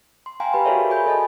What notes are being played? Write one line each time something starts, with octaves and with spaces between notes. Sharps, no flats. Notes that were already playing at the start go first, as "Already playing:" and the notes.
C6
F5 G5 G#5 A#5 C6
G4 B4 B5 C6
F#4 G#4 A#4 C#5 D5 E5
G#5 B5 G6
A4 D#5 A5